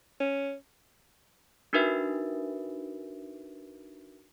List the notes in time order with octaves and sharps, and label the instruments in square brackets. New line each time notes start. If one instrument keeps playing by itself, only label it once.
[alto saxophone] C#4
[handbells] D4 D#4 F#4 A#4 B4 E5